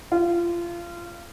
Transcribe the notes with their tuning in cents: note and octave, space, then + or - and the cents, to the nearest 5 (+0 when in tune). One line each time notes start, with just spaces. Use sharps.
F4 -25